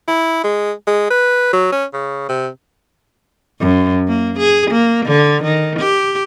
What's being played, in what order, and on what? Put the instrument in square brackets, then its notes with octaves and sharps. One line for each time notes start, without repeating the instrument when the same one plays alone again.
[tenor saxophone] E4
G#3
G#3
B4
F#3
C#4
C#3
C3
[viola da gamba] F#2
A#3
G#4
A#3
D3
D#3
G4